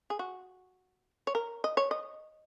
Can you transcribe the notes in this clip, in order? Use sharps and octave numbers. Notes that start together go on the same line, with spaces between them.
G#4
F#4
C#5
A#4
D#5
C#5
D#5